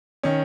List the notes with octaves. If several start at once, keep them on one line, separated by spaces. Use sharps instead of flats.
D#3 C#4